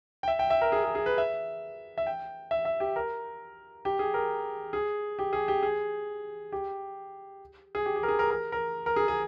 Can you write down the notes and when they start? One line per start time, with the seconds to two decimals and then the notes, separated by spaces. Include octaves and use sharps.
0.23 G5
0.28 E5
0.39 G5
0.50 E5
0.61 A#4
0.72 G#4
0.84 G#4
0.95 G#4
1.06 B4
1.18 E5
1.98 E5
2.07 G5
2.51 E5
2.65 E5
2.80 G4
2.96 A#4
3.85 G4
3.99 G#4
4.14 A#4
4.73 G#4
5.19 G4
5.33 G#4
5.48 G4
5.63 G#4
6.52 G4
7.75 G#4
7.86 G4
7.96 G4
8.03 A#4
8.08 G#4
8.19 A#4
8.31 A#4
8.52 A#4
8.86 A#4
8.96 G#4
9.08 G#4